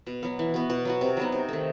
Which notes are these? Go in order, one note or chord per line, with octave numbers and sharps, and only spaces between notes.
B2
F#3 B3
E3
B3 F#4
B2
F#3 B3 F#4
C3
F#3 B3 D#4
C3
D#3 A3